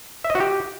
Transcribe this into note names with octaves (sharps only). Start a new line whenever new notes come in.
E5
D#5
F#4
G4